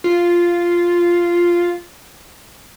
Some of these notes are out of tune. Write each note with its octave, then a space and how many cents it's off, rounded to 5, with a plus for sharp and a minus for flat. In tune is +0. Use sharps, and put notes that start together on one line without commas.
F4 -5